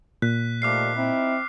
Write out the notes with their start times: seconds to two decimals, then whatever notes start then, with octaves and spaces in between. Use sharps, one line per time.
0.22 A#2 F#6 B6
0.62 D#3 F3 G3 A3 D6 F6 C7
0.95 C4 D#4 E4